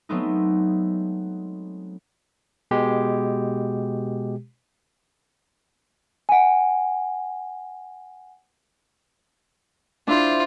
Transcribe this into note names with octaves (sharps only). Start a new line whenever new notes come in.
F#3 G#3 A3 B3 C4 D#4
B2 G#3 G4
F#5 G#5
D4 E4 F4 C5